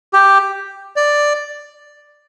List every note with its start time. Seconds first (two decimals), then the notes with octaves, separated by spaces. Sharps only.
0.13 G4
0.96 D5